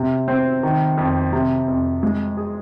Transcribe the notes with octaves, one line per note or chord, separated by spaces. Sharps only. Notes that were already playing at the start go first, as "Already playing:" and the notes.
Already playing: C3
C4
D#3
F2
C3
F2
G#3
G#4